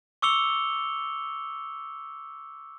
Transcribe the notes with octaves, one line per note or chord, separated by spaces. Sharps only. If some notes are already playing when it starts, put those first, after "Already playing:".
C#6 D6 E6 C#7 F7 G7